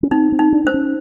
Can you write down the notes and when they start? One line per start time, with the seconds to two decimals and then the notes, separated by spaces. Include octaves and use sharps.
0.03 C#4
0.11 C4 D#4
0.32 C4
0.39 D#4
0.53 D4
0.65 D4 C5
0.74 C#4